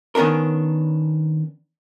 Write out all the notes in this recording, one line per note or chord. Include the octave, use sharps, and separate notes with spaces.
D#3 B3 C#4 D4 A#4